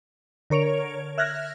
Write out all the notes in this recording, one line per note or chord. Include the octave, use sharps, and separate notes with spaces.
D3 A#4 C#5 D7 F7
E5 F6 F#6 G#6 A#6